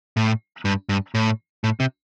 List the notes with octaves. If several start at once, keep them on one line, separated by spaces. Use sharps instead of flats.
A2
G2
G2
A2
A2
C3